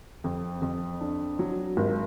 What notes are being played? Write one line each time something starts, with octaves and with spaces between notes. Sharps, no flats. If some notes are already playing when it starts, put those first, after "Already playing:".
F2
F2
D4
F#3
G#1